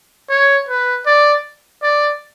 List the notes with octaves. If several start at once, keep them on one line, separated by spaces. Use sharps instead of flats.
C#5
B4
D5
D5